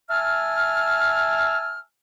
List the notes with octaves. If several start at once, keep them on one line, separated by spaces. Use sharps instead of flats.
E5 G#5 A5 E6 F6